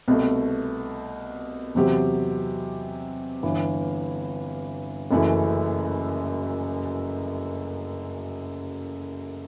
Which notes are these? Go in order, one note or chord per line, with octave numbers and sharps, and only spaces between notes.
C2 B2 A3
E2 C3 F#3 C4 G4
G1 G2 E3
F#1 F#2 E3 A3 E4